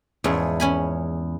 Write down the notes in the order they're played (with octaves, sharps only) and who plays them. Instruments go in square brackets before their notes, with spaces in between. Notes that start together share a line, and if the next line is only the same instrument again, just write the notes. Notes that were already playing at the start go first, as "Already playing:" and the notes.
[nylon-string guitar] E2 [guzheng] G#2 F3 C#4
[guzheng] C#4 G#5 B5